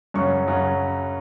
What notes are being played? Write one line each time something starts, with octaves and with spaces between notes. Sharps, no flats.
F#2 C#3 F#3 C#4 C#6
F#2 C#3 F#3 C#4